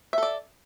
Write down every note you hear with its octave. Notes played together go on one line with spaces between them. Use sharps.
A4 D5 E5